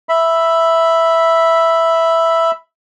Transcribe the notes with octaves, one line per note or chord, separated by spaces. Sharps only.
E5 B5